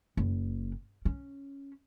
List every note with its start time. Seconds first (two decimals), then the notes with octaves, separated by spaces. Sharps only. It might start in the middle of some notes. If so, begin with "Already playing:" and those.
0.17 F#1
1.05 C#4